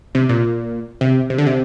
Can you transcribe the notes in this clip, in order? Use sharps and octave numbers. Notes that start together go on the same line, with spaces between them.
C3
A#2
C3
C3
D3
C3